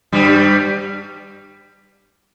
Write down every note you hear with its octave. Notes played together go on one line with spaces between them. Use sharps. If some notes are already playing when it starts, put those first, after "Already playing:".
G2 G3